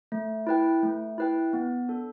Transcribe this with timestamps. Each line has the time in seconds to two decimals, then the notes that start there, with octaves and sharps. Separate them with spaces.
0.12 A3
0.47 E4 B4 G5
0.83 A3
1.18 E4 B4 G5
1.53 B3
1.89 D4 A4